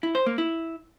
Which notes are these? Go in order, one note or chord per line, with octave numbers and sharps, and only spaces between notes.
E4
C5
A#3
E4